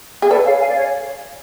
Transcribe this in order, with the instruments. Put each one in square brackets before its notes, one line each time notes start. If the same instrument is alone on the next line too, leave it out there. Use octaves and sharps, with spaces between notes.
[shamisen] G#4
[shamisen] A4 [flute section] B4 D5
[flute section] C#5 F5
F5 G#5
D5
C#5 F5